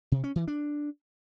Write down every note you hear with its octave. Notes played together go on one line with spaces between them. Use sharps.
C3
C#4
E3
D4